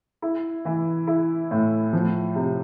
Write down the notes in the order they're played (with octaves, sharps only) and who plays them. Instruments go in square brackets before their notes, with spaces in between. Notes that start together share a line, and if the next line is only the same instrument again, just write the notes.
[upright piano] E4
E3
E4
A2
F3
C3